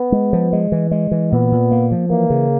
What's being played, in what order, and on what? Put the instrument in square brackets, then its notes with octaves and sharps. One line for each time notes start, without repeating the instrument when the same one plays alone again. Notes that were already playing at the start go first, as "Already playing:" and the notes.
Already playing: [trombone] B3
[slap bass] G#3
F3
G#3
E3
G#3
E3
[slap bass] A#2 [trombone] B3
[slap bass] A#2
A#3
F3
[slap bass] E3 [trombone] A#3
[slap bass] C#3